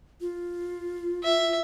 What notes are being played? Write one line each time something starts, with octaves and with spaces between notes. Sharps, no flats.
F4
E5